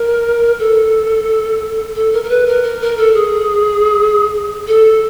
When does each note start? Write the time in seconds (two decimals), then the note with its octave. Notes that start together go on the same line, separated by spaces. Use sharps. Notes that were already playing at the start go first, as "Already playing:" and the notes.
Already playing: A#4
0.59 A4
1.95 A4
2.13 A#4
2.24 A#4
2.29 B4
2.47 A#4
2.63 A#4
2.81 A#4
2.97 A4
3.14 G#4
4.67 A4